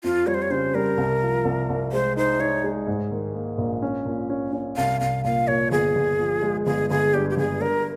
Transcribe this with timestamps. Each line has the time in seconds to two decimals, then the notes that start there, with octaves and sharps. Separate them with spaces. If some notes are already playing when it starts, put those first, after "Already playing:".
0.04 F2 F4
0.27 G3 C#5
0.34 C5
0.42 C#5
0.50 C#3 C5
0.75 G3 A#4
0.98 C2
1.22 F3
1.45 C2
1.69 C2
1.92 G#3 C5
2.17 D#4 C5
2.40 D#4 C#5
2.64 G#3
2.87 G#2
3.11 D#3
3.34 A#3
3.58 A#1
3.82 C#4
4.06 A#2
4.30 C#4
4.53 C#4
4.77 C2 F5
5.01 C2 F5
5.24 A#2 F5
5.48 A#2 C#5
5.71 G1 G#4
5.96 G1
6.19 F3
6.43 G#3
6.66 G1 G#4
6.90 G1 G#4
7.14 G2 G4
7.30 G4
7.37 G1 G#4
7.61 G2 A#4